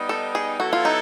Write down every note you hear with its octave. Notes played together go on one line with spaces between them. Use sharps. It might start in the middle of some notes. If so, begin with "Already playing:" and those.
Already playing: G3 B3 D#4
A4
G#4
F#3 B3 E4 F#4 A4
F4
D#4